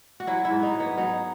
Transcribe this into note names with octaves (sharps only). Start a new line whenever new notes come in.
F#4
F#3 E4
E4
G#2
D#4
F#3
B3
F#3 D#4